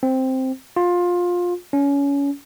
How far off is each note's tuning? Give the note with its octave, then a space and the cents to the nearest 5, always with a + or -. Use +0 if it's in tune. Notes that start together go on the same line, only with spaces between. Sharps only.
C4 +0
F4 +20
C#4 +25